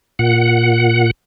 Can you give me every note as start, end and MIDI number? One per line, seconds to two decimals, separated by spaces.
0.19 1.11 46
0.19 1.11 78